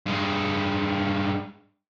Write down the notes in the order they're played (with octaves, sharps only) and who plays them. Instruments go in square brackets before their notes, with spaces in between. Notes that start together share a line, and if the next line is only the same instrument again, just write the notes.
[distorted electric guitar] G2 G#3